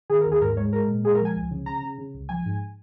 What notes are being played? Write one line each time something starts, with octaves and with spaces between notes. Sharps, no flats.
D#3 G#4
A#4
D#2
G#4
G#2 A#4
G#3 C#5
G#3 A#4
A#2
G#3 G#4
A#4
F3
G#5
C#2
C#3
C#3 A#5
C#3
C#3
C#2
F3 G#5
G#2